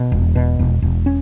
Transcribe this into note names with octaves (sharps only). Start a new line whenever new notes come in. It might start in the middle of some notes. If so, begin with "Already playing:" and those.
Already playing: B2
E1
B2
E1
E1
C#4